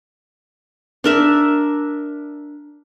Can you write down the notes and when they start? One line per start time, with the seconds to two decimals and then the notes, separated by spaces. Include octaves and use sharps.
1.04 D4 A#4 E5